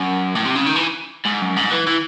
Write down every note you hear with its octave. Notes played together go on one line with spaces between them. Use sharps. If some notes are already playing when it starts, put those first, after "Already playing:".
Already playing: F#2
A2
C3
C#3
D#3
E3
G#2
F#2
G#2
E3
E3